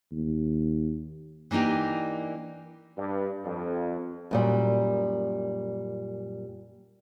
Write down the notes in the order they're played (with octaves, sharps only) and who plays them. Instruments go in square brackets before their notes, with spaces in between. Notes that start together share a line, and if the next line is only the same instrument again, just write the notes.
[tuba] D#2
[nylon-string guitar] E3 A#3 D4 D#4 G4
[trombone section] G2
F2
[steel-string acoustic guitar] F#2 A#2 G3